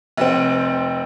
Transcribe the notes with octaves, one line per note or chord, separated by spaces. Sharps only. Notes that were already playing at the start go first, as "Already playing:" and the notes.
F1 C4